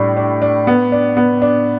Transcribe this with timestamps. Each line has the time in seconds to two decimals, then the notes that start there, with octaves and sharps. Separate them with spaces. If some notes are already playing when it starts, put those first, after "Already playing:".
Already playing: A2 G3 D4
0.17 D4
0.42 D4
0.67 B3
0.92 D4
1.17 B3
1.42 D4